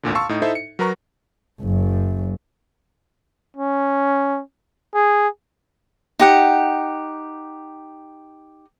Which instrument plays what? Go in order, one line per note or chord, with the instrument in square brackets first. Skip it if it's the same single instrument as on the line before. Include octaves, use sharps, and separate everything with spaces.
[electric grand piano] G#1 D2 A#2 D3
F5 A5 C6 C#6 E6 C#7
A2 D#4
D#4 E4 A4 C5 E5
C#7
F#3 A#4 B4 A#5 C#6
[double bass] F#1 F#2
[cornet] C#4
G#4
[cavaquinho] D#4 G4 F#5